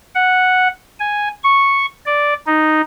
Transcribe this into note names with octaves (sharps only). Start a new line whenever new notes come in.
F#5
G#5
C#6
D5
D#4